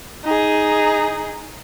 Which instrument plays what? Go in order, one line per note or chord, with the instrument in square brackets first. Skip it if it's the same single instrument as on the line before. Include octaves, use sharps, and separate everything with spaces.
[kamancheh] D#4 G#4